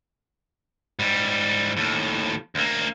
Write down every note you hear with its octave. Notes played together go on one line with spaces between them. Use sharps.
G#2 G3
D#2 A2
D2 A#3